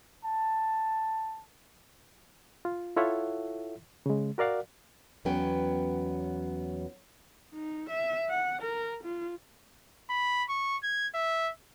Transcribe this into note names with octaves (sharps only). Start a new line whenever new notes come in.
A5
F4
E4 F4 A4 C#5 E5 F#5
C#3 G#3
F#4 A#4 D5 F5 F#5
E2 F#3 B3 C#4 B4 G5
D#4
E5
F#5
A#4
F4
B5
C#6
G#6
E5